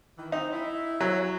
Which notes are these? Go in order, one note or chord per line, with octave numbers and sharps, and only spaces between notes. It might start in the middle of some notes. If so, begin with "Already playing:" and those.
D#3 E3
C4 D#4
E4
F#3